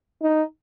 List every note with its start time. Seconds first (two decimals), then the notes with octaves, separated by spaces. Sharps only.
0.22 D#4